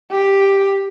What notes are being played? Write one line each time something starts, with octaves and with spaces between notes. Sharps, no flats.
G4